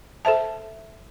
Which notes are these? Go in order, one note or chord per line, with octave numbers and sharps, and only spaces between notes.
A4 C5 E5 A5